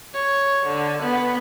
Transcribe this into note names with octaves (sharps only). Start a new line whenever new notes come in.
C#5
D3
B3